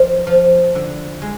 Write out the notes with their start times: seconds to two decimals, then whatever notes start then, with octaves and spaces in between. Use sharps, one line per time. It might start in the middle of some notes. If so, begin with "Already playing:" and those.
Already playing: F3
0.27 F3
0.75 D3
1.22 G#3